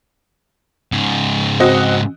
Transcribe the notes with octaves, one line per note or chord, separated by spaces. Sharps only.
G#2 C#3
C4 F#4 D#5